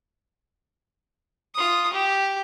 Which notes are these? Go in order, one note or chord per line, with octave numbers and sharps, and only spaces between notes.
F4 D#6
G4